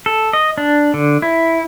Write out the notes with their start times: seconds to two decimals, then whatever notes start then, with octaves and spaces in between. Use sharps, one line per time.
0.06 A4
0.33 D#5
0.58 D4
0.94 D3
1.22 E4